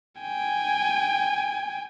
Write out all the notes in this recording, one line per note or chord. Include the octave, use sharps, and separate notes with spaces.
G5 G#5